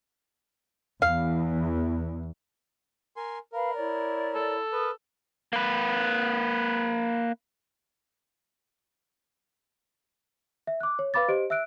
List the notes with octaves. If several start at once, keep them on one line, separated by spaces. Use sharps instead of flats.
E2 F5
A#4 G#5 C6
A#4 B4 F5 B5
E4 C#5 D5
A4
A#4 B4 D#6
A#3 B4
E5
D6 F#6
C#5
B4 F5 B5 D6 A6
G4 C5 D#5 D7
E5 E6 F#6 D7